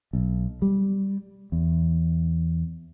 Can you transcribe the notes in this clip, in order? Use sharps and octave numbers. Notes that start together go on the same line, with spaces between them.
B1
G3
E2